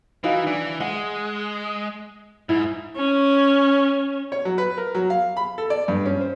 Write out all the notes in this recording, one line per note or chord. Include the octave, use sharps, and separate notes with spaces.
E3 D#4 F#4 F5
E3 D4
G#3 F#5
G#2 E4
C#4
C#5
F#3
B4
A#4
F#3
F5
B5
A4
D5
G2
C#4
C5